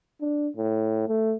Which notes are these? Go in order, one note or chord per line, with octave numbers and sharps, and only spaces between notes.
D4
A2
A3